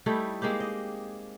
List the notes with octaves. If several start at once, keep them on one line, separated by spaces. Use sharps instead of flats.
G3 A3 D#4 E4
G#3 A#3 C4 G4
D#5